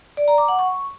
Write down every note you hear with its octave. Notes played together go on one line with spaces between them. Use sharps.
D5
A#5
D6
F#5
C#6